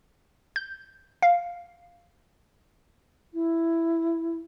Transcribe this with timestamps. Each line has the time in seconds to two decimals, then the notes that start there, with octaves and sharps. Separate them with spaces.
0.56 G6
1.22 F5
3.33 E4